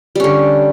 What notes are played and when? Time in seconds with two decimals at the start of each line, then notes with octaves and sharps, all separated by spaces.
0.15 G3
0.20 C#4
0.24 D3